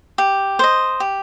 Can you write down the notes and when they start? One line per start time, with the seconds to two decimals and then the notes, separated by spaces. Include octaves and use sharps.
0.18 G4
0.59 C5 D#5
1.00 G4